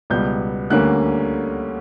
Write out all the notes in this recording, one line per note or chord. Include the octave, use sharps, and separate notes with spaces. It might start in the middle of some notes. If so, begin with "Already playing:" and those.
C#2 B2 G3 B3 G6
D2 D3 G3 A#3 C#4 F#6